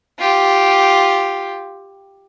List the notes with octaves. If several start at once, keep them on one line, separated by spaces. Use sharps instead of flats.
F4 G4